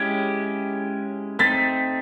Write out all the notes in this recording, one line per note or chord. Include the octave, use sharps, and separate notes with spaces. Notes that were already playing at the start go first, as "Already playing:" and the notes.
Already playing: G#3 C#4 E4 G4 G#6
A3 C4 D#4 A6 B6